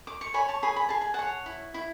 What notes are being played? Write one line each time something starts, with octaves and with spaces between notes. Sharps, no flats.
D6
C#6
C#5 G#5 B5
A5 C#6
G#4 G#5 B5
B5
G#4 A5
G#5
C#5 F#5 A5
E4
E4